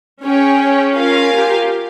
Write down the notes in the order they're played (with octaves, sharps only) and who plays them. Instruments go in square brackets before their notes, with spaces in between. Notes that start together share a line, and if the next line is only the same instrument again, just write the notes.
[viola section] C#4 [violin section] G#4 C#5 G5
[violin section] F4 A#4 F5 G#5
[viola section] G4